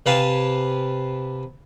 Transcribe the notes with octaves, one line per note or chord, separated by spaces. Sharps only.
C3 B4 F5 G#5 A5